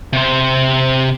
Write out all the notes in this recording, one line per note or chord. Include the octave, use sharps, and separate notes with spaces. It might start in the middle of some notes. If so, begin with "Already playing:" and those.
C3 C5